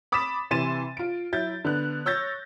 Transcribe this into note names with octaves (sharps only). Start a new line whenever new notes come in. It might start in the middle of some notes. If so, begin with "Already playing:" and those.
B5 D6 D#6 A6 B6 E7
C3 E3 C6 A6 D#7 E7
F4 D7
F#3 E4 G6 A6
D3 B3 F#6
C#5 E6 G6 A6 A#6